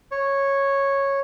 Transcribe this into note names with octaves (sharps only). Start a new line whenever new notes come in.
C#5